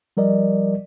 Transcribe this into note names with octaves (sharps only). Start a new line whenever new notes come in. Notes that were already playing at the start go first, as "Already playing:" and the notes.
F3 G3 A#4 D5 D#5